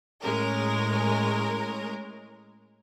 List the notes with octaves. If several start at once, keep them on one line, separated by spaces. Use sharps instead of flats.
A2 G#3 C#4 A#4